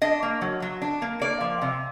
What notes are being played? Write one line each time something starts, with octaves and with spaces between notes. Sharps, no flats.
D4 D#5
A#3
F#3
F#3
D4
A#3
A#3 D5
F3
C3